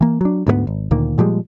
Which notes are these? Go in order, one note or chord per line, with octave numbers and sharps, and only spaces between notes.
E3 A#3
F#3 D4
D2 G#2 G3 B3
G#1
D2 A#2 D#3 A#3
A#2 F3 G3 G#3